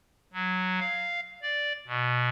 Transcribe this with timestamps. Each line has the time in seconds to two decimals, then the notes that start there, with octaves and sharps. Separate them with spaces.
0.33 F#3
0.80 F5
1.42 D5
1.87 B2